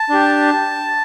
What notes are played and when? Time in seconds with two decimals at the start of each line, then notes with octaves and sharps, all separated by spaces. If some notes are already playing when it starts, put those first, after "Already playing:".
Already playing: A5
0.10 D4 G4